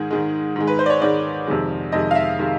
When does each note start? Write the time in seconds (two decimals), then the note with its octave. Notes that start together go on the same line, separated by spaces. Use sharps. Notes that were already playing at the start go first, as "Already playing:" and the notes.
Already playing: G#2 D#3 G#3 G#4
0.11 G#2 D#3 G#3
0.56 G#2 D#3 G#3
0.67 B4
0.79 C5
0.86 D5
0.90 C#5
1.01 G#2 D#3 G#3 D5
1.47 F2 C3 D#3 G#3
1.92 F2 C3 D#3 G#3 D#5
2.11 F5
2.15 E5
2.38 C3 D#3 G#3